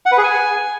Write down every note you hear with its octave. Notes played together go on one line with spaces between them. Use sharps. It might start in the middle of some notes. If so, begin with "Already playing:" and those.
F#5
B4
G#4
G#5